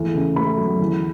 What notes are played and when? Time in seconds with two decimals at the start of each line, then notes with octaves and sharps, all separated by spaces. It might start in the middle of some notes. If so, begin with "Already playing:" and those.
Already playing: E2 A3
0.15 C#3
0.36 A3 B5
0.58 F#3
0.80 E2